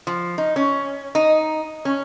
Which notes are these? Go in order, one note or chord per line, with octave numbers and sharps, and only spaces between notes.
F3
D#4
C#4
D#4
C#4